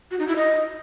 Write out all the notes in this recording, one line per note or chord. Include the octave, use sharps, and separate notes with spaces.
F#4
D#4
E4
D#5